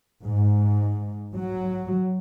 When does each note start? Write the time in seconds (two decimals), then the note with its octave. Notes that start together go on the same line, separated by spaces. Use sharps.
0.24 G#2
1.33 F#3